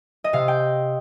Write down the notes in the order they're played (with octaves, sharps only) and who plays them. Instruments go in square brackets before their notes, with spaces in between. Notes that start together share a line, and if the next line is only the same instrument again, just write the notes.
[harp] D#5
C3 F5
G5